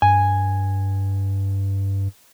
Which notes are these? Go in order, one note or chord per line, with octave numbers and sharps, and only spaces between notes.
G2 G#5